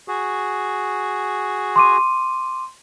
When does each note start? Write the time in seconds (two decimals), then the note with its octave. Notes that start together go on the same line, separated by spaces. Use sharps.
0.08 F#4 G#4
1.76 C6 D6 D#7